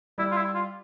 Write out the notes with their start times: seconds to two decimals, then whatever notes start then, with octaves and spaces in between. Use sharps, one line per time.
0.18 G3 E4
0.31 F4
0.37 E4
0.55 F4